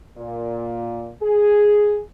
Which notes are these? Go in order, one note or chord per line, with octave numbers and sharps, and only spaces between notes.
A#2
G#4